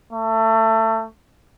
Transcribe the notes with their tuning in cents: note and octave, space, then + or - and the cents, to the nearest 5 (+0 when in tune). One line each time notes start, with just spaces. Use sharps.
A3 +25